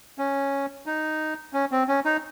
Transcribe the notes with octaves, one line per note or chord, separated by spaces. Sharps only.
C#4
D#4
C#4
C4
C#4
D#4